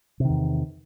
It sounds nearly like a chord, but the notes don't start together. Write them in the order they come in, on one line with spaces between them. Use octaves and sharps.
C3 D#3 E2